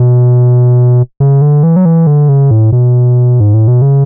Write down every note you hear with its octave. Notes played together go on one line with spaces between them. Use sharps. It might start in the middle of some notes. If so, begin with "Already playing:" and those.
Already playing: B2
C#3
D3
E3
F#3
E3
D3
C#3
A2
B2
G#2
A2
B2
C#3